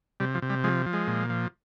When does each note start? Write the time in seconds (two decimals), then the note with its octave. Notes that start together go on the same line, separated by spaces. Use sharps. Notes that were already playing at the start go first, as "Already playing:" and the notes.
0.20 C3 G3
0.35 F3
0.42 C3
0.50 G3
0.64 F3 G#3
0.86 F3
0.93 G#3
1.07 A#2
1.30 F3